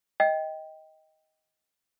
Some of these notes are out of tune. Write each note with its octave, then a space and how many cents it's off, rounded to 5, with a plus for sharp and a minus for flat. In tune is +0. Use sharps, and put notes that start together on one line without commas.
D#5 +20 G5 +0